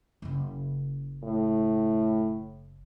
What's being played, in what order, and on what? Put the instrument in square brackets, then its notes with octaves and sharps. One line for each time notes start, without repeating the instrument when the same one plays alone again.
[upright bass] F#1 C#3
[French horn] A2